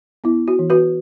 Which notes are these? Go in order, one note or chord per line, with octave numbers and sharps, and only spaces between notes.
B3 E4
F#4
E3
F#4 B4